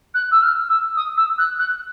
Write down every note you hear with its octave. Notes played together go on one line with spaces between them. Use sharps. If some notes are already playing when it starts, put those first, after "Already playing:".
F#6
E6
F6
E6
D#6
E6
F#6
F#6